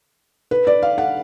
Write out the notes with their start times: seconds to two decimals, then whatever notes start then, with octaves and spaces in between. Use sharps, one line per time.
0.51 B4
0.67 D5
0.82 F5
0.98 F#5